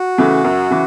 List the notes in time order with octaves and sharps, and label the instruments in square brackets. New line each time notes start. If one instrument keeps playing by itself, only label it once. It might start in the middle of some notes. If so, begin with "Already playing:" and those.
Already playing: [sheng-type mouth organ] F#4
[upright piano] C#3 E3 A3
F#2
C#3 E3